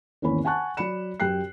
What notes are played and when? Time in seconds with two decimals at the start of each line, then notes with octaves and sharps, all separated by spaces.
0.22 G#1 E2 A#3 C#4 B5
0.45 F#5 G#5 A5 C#6 F#6
0.77 F#3 D5 B5 C#7 E7
1.20 F#2 G4 G5 F#6 C7